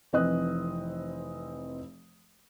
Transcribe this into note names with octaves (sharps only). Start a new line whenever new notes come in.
F1 E3 C4 D#5 D#6 F#6